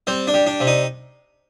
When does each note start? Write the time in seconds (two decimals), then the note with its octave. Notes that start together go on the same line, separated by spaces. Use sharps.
0.07 G3 C4
0.27 D4
0.34 G3
0.47 D4
0.60 C3
0.67 D#4